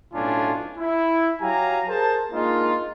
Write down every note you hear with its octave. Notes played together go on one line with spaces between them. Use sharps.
B1 A2 C#4 D4 F4 G#5
E4
F#3 G4 F5 G#5 A#5
G#4 A#4 C5 A5
G#3 A#3 D4 D#4 F4